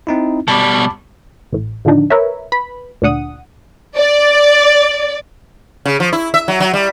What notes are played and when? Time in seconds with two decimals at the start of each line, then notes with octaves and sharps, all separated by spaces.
0.07 C4 D#4 E4
0.48 B2 G3 A5 B5 D6
1.53 A1 A2
1.85 A2 D3 D#3 F3 D4 D#4
2.10 A#4 B4 C#5 E5
2.52 B4 B5
3.02 D2 A#2 D4 F#5 D#6
3.97 D5
5.85 C#3
6.00 F3
6.13 E4
6.34 E5
6.48 F#3
6.60 F#3
6.73 G3